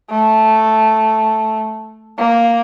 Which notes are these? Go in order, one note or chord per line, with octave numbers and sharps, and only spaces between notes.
A3
A#3